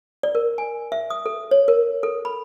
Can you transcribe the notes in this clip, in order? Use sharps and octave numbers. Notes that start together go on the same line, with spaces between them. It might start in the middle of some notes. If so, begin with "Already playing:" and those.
D5
A#4
G#5
E5
D#6
A4
C#5
A#4
A4
B5